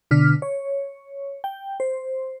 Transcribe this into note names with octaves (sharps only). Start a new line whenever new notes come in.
B2 D3 D4 F6 B6
C#5
G5
C5